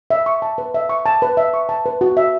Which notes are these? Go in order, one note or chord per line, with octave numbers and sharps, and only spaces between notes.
E5
C#6
A5
B4
E5
C#6
A5
B4
E5
C#6
A5
B4
F#4
E5